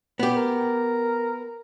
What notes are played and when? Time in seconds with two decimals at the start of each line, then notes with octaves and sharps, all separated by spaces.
0.19 B3 G4
0.35 A#4